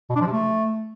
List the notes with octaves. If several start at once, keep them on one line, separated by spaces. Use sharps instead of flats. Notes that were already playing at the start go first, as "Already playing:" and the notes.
B2
D4
F3
C3
A3